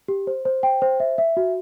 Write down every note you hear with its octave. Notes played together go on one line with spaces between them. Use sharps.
G4
C5
C5
G5
C5
E5
E5
F#4